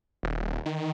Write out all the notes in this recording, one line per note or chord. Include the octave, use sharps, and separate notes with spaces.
D#1
D#3